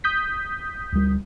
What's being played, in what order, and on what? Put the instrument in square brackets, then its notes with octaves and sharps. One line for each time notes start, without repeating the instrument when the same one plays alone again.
[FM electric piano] D#6 G6 B6
[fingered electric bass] D2 G3